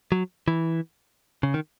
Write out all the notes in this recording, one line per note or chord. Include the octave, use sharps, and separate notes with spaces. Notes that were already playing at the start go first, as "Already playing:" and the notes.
F#3
E3
C#3
D#3